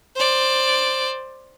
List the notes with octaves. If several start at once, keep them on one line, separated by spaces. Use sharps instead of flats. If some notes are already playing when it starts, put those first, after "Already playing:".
C5 D5